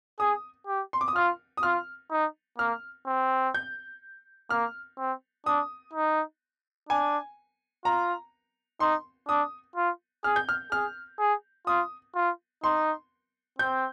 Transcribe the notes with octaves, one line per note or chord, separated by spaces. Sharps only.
G#4 D#6
G4
C6
D6
D#6
F4 F6
D#6
F4 F6
D#4
A#3 F6
C4
G6
A#3 F6
C4
D4 D#6
D#4
D4 G#5
F4 A#5
D#4 C6
D4 D#6
F4
G#4 F6
G6
F6
G#4 F6
G#4
F4 D#6
F4
D#4 C6
C4 G6